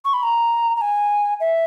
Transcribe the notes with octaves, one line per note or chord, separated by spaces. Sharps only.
C#6
B5
A#5
A#5
G#5
E5